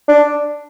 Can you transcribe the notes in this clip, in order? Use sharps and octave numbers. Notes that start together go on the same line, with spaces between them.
D4